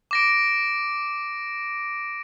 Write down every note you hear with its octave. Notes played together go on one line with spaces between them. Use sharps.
D6 A#6 D7